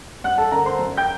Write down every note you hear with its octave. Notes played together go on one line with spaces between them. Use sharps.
G2 F#5 F#6
A4 A5
D3 A#4 A#5
C5 C6
F#2
G5 G6